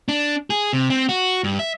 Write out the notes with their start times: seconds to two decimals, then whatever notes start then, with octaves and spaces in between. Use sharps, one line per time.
0.08 D4
0.50 G#4
0.73 C3
0.90 C4
1.09 F#4
1.44 G2
1.59 E5